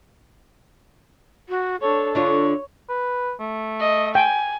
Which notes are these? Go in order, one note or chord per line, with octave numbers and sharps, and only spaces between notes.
F#4
D4 A4 C#5
D3 D4 F4 C#5
B4
A3
D#5
G5 G#5